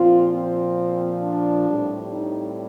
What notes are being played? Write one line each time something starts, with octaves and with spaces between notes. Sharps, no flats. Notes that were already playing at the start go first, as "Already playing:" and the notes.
Already playing: A#2 F3 C4 F4
C4
D4
A2 G3 C4
D#4